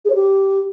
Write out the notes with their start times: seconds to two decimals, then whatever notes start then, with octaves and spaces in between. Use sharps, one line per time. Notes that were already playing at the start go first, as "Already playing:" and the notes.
0.05 G#4
0.10 C#5
0.15 G4